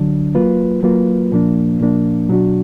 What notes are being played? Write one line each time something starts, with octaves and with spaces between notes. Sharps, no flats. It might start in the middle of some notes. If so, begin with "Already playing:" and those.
Already playing: D2 D3 F#3 D4
F#3 A#3 F4 B4
F#3 A#3 F4 B4
A#2 F3 A#3 D4
A#2 F3 A#3 D4
B2 F#3 D4 F#4